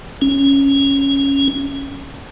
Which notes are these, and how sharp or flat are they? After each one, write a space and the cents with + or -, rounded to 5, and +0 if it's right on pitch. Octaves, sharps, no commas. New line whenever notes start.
C#4 -5